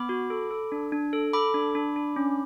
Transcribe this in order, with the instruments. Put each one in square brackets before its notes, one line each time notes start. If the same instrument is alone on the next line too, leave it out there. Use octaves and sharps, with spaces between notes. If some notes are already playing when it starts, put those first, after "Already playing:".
Already playing: [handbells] B3 B5 D6
F#4
A4
A4
D4
D4
A4
A4 B5 D6
D4
D4
D4
C#4